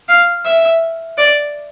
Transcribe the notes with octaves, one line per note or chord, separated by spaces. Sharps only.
F5
E5
D5